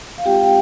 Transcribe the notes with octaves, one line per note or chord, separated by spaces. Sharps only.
F5
G#3 C4 F4 G4 G5